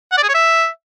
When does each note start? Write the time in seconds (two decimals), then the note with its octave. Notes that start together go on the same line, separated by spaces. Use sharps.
0.12 F#5
0.17 D5
0.23 G#4
0.29 C#5
0.34 E5